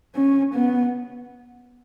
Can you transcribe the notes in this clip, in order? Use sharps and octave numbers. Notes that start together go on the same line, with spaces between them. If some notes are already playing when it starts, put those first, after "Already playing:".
C#4
B3